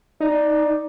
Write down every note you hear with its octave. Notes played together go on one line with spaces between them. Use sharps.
D#4 D5